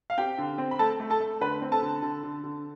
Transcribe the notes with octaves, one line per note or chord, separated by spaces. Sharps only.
F5
C4 G4 G5
D3
C4
B5
A3 A4 A5
A3
A4 A5
A3
D3 B4 B5
C4
A4 A5
D3
D3
D3
D3